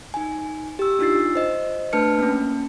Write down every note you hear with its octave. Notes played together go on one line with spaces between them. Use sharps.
D#4 G#5
G4 E6
D4 D#4 F4 E6 A6 C7
C5 D#5
A3 D4 B4 A5 F6 C#7
A#3 C#4